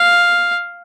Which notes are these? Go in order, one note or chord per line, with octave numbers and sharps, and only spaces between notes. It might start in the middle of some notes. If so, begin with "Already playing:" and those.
Already playing: F5